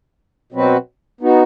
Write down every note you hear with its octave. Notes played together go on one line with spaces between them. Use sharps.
B2 F#3 C4 F#4 B4
B3 D#4 F#4